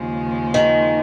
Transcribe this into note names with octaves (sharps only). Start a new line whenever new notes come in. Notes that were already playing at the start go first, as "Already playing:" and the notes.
Already playing: D#2 C#3 F3 G#3
D#3